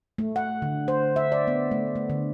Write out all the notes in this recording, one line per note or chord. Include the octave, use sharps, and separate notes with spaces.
A3
F#5
D3
C5
E5
D5
B3
A3
A3
D3